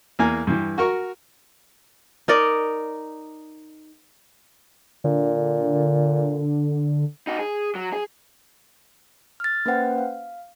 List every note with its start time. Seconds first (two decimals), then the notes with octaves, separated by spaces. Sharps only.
0.19 E2 A#3 G#5 A#5
0.47 G2 E3
0.78 F#4 A#4 C#6
2.28 D#4 A#4 D5 D#5
5.04 A#2 D3
7.27 D#4 F#4
7.39 G#4
7.75 F#3
7.93 G#4
9.40 F6 A6
9.66 A#3 C#4 B4 C5 F#5 G5
9.98 F5